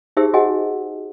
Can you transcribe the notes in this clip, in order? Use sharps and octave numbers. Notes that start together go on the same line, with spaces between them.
D#4 G4 G#4 C5 E5 E6
F#4 G#4 D#5 F#5 G#5